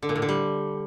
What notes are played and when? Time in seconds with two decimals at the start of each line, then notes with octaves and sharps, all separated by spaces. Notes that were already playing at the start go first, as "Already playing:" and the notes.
0.03 D3
0.09 A#2
0.16 A2
0.22 D3
0.29 G3